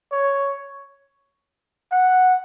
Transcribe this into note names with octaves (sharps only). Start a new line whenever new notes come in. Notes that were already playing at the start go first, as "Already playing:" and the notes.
C#5
F#5